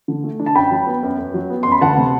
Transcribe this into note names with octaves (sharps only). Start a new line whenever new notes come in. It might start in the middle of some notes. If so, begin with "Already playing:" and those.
D3
A3
D4
A5
F#2 G5 B5
F#3
B3
F#2
F#2
F#3
B3
F#2 C6
B5
D2 F#5 A5
C3